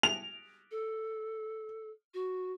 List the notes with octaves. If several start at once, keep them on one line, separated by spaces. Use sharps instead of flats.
F7
A4
F#4